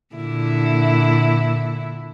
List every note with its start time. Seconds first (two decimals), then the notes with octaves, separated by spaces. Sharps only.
0.15 A#2 D3 E4